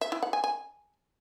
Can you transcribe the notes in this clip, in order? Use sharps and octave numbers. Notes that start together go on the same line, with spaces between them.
E5
E4
F#5
G#5
G#5